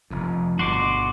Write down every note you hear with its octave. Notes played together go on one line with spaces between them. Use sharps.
F1 F2
G1 B2 F#4 C6 D6